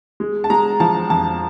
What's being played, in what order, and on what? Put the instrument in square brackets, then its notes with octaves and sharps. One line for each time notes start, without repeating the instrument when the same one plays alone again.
[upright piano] G#3
A5
G#3 A#5
F3 A5
F2 A5